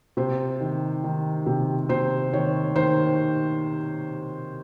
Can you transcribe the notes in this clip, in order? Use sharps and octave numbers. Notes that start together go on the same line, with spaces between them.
C3 C5
D#3
D#3
C3
C3 C5
D#3 C#5
D#3 C5